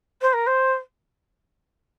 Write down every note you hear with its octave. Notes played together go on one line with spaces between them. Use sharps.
C5
A#4
C5